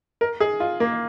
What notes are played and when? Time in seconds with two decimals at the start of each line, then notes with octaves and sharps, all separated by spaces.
0.21 A#4
0.40 G#4
0.60 F4
0.80 A#3